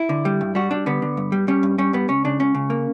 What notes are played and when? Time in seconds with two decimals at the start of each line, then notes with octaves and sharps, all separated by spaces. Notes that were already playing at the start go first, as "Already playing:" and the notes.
Already playing: E4
0.09 D3
0.25 G3
0.41 G2
0.55 G3 F#4
0.71 G3 D4
0.86 D3 B3
1.02 D3
1.17 G2
1.32 G3
1.48 G3 C#4
1.63 G2
1.78 G3 C#4
1.93 G2 B3
2.08 C#2 C#4
2.25 C#3 D4
2.40 C#2 C#4
2.55 C#3
2.70 A#3